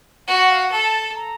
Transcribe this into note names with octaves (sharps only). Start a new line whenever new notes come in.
F#4 F#5
F#5
F5
F#5
A4 A5
A#5